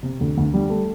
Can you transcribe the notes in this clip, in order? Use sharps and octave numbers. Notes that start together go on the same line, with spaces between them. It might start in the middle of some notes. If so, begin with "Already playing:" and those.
C3
D2
D2
G3
A3